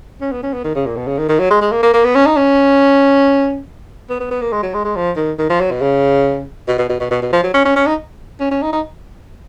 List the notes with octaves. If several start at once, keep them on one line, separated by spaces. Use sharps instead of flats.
C#4
B3
C#4
B3
D#3
C#3
A#2
B2
C#3
D#3
D#3
F#3
G#3
G#3
A#3
A#3
A#3
B3
C#4
D#4
C#4
B3
B3
B3
A#3
G#3
F#3
G#3
G#3
F3
D#3
D#3
F3
F#3
B2
C#3
B2
B2
B2
B2
B2
B2
F3
F#3
C#4
C#4
C#4
D#4
C#4
C#4
D#4
D#4